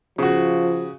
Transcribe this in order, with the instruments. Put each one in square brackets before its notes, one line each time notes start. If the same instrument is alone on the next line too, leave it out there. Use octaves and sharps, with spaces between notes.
[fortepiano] C#3 F#4 [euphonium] F3